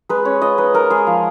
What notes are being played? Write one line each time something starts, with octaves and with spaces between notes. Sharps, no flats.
G#3 B4
C#4 C#5
F4 D#5
D#4 B4
D#4 A#4
G#3 G#4
F3